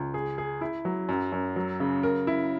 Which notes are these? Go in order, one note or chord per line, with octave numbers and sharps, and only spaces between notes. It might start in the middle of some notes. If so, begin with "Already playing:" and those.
Already playing: C#2
G#4
G#4
E4
F#3
F#2
F#2
F#3
C#3
A#4
E4